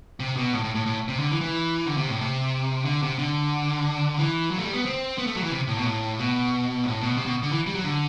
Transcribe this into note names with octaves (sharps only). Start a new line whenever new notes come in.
C3
B2
A2
A2
A2
A2
C3
D3
E3
E3
D3
C3
A2
C3
D3
C3
D3
E3
F#3
A3
G3
B3
C4
B3
A3
F#3
E3
C3
A2
B2
A2
B2
A2
B2
C3
B2
D3
E3
G3
F#3
D3